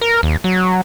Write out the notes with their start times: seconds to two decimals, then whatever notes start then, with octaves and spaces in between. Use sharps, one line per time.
0.01 A#4
0.23 D#2
0.44 F#3